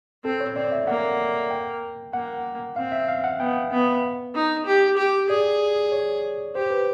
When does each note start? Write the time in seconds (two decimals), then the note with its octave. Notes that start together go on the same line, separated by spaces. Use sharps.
0.24 C4 A4
0.40 C#5
0.56 C4 D5
0.72 E5
0.87 A#3 F#5
1.51 G5
2.13 A#3 F#5
2.76 C4 F5
2.92 E5
3.08 F5
3.24 F#5
3.39 B3 G5
3.71 B3
4.35 D#4
4.66 G4
4.97 G4
5.29 G#4 D5
5.92 C#5
6.55 G4 C5
6.70 B4